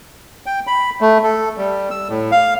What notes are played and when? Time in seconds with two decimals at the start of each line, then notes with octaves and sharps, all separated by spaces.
0.46 G5
0.67 B5
1.01 A3
1.23 A4
1.57 G3
1.91 E6
2.09 A2
2.32 F5